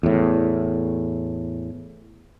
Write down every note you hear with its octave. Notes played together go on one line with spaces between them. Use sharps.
E2 A2